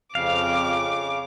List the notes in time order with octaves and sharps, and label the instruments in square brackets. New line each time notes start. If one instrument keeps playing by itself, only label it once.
[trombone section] F2 [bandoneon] C#3 [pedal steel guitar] F5 [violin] D6